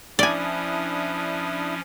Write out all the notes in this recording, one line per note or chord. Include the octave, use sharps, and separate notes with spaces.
F3 C#4 D4 E4 D5 G#5 D#6